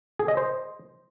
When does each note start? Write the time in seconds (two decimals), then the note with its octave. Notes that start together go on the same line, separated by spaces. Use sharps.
0.19 G#4
0.28 D#5
0.37 C5